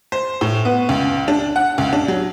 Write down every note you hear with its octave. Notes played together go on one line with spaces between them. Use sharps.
C5
A2
B3
C#2
D4
F#5
C#2
D4
F#3